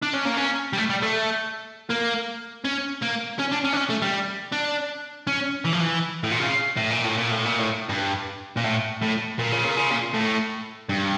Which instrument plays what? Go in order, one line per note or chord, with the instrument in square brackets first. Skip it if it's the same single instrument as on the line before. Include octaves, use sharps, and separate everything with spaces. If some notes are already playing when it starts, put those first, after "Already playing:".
[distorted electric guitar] D4
C#4
A#3
C#4
G3
A3
G3
A3
A#3
C#4
A#3
C#4
D4
C#4
D4
C#4
A3
G3
D4
C#4
E3
F3
E3
A2
A#2
C#3
A2
A#2
A2
A#2
A2
A#2
A2
G2
A#2
A2
A2
A#2
C#3
A#2
C#3
A#2
A2
G2